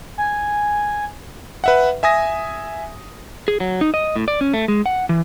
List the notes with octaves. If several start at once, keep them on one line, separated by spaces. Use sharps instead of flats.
G#5
B4 E5 F#5
E5 G#5 D#6 A#6
G#4
F#3
D#4
D#5
A2
D5
C#4
A3
G#3
F#5
E3